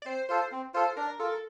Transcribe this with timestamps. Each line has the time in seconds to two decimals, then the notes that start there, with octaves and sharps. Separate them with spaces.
0.02 D5
0.06 C4 C5
0.29 F4 A4 C5
0.52 C4
0.74 F4 A4 C5
0.97 D4 A#4
1.19 F4 A4 A#4